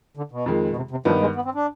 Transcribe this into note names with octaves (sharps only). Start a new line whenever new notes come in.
D3
B2
F2 D#3 G#3
B2
C3
C3
G2 D#3 F3 B3 D#4
G#3
B3
C4
D4